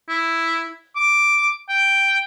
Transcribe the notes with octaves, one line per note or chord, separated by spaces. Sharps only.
E4
D6
G5